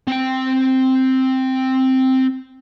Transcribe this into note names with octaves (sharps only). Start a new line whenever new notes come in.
C4 G5